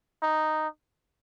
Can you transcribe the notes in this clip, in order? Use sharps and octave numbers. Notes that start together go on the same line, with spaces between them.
D#4